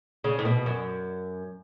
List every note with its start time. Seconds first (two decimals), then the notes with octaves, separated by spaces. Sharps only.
0.24 C#3
0.39 A2
0.45 B2
0.66 F#2